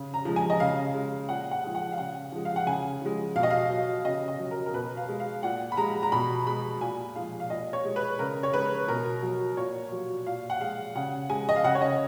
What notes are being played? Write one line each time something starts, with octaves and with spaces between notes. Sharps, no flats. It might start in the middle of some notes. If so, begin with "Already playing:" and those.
Already playing: C#3
A#5
F3 G#3
G#5
D#5
C#3 F5
G#3
A#2 F#5
F#5
F3 G#3
F#5
F5
C#3 F#5
F3 G#3
F5
F#5
C#3 G#5
F3 G#3
B2 F5
D#5
F5
F#3
C#3 D#5
D#5
F#3
A#4
A#4
B2 B4
F5
G#3
F5
A#2 F#5
B5
G#3 A#5
A#5
B2 B5
G#3 B5
A#2 G#5
F3 G#3 F5
F5
A#2 D#5
C#5
G#3
B4
C#3 A#4
C#5
G#3 B4
B2 A#4
F#3
A#2 C#5
F#3
A#2 F5
F#5
G#3 F5
C#3 F#5
G#3 G#5
D#5
F5
C#3 F#5
C#5
D#5